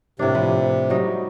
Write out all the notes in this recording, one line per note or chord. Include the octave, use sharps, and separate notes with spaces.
A2 C3 A#3 D4
F3 B4
F#3 G3 D#4